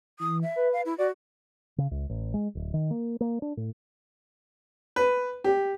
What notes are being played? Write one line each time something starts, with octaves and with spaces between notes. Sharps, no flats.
E3 D#6
E5
B4
F5
E4
F#4 D5
C#3
C#2
A1
G#3
D1
D#3
A#3
A#3
D4
A2
B4
G4